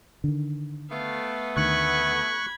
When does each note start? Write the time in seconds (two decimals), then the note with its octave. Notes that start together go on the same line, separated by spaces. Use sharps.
0.24 D3 D#3
0.91 A3 B3 F5
1.57 D2 D#3 B5 C#6 F#6 G#6